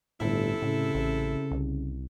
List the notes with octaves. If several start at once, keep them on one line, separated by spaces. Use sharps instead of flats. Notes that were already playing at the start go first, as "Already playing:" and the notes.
G1 A2 C3 E4 A4
A2 C#3
A1
C2